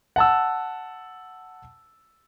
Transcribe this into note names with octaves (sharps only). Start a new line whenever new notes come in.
F#5 A5 E6